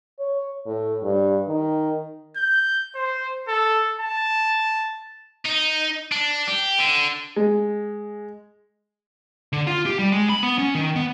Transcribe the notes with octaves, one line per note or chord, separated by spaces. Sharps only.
C#5
A2
G2
D#3
G6
C5
A4
A5
D#4
D4
G4
D3
G#3
D3
F4
G4
G3
G#3
B5
B3
C#4
D#3
B3